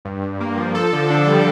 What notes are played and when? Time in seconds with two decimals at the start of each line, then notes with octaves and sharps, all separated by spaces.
0.05 G2
0.23 G2
0.41 A#3
0.58 F3
0.75 A4
0.93 D3
1.10 D4
1.27 G3